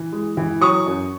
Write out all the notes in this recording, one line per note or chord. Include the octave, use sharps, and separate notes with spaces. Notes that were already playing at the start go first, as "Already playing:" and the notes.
Already playing: E3
G#3
E3
F#3 C#6 D#6
F#2